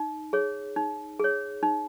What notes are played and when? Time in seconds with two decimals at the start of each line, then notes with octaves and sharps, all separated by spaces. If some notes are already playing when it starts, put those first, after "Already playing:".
Already playing: D#4
0.33 G#4 C#5
0.76 D#4
1.20 G#4 C#5
1.63 D#4